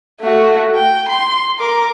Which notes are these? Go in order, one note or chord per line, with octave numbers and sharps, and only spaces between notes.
A3 F#4
G5
C6
A#4 D6